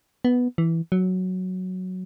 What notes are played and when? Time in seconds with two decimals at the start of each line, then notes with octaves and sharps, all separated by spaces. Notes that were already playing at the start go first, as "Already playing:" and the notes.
0.25 B3
0.58 E3
0.92 F#3